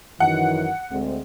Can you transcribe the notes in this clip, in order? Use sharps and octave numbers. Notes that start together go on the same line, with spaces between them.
F#2 D#3 E3 F#5
D2 G#3 C4